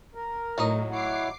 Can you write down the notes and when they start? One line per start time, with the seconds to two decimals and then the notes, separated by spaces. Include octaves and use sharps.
0.15 A#4
0.58 A2 F#3 D#4 D#5
0.91 E4 C#5 F#5 D6 C7